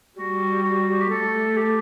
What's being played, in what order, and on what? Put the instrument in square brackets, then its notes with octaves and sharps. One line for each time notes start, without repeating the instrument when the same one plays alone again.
[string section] G3 [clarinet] F#4
[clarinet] F#4
G4
[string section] A3 [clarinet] A4
[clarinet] G4